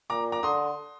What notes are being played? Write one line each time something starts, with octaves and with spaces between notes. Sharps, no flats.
A#2 A#5 D6
A#5 D6
D3 C6 D#6